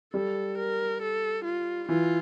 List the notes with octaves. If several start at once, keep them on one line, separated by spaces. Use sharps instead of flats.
G3 A4
A#4
A4
F4
E3 F4